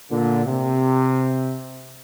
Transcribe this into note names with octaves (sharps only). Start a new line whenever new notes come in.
A#2 D3
C3